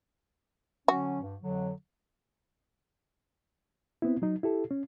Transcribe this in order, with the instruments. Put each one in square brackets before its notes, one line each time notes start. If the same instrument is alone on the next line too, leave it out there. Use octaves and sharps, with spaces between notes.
[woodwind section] D3 F#3 C#4 [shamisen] F#4
[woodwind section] G2
F2 D3 F#3
[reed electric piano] B3 C4 E4
F#3 D#4
E4 G4 A4
C#4